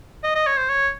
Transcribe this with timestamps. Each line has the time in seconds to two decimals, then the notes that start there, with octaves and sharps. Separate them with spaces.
0.24 D#5
0.36 D#5
0.47 C#5
0.57 C5
0.69 C#5